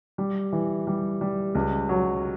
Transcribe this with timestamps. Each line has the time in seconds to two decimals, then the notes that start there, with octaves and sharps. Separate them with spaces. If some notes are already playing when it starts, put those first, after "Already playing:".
0.18 G3
0.52 E3
0.87 G3
1.21 G3
1.55 C#2
1.89 F#3